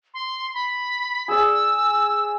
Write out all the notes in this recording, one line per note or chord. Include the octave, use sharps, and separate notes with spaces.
C6
B5
G#4 D5 E6